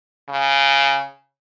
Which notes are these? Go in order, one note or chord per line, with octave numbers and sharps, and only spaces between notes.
C#3